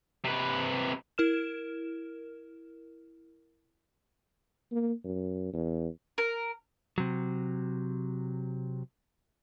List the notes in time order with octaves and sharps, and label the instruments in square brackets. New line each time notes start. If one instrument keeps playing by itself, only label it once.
[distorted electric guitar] C3 B4
[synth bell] E4 A#4 F6 E7
[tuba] A#3
F#2
E2
[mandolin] A#4
[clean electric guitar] C3 F#3